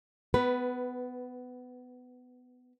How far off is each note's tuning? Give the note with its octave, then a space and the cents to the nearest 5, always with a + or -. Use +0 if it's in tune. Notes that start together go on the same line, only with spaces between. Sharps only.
B3 +20 B4 +0